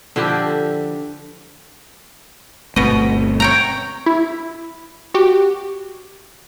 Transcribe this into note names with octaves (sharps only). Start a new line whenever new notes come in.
D3 F3 E4 G4
G1 B2 A3 C4 D#5
C#5 G5 A#5
E4
F#4 G4